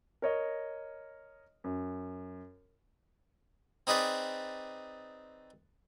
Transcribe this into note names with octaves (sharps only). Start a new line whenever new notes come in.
A#4 C#5 D#5
F#2
C4 D#4 G#4 B4 D5